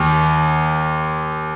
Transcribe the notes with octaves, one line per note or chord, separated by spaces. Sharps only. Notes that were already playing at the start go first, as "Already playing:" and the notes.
Already playing: D#2